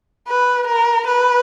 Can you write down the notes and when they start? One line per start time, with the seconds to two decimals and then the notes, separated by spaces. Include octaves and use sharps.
0.28 B4
0.67 A#4
1.07 B4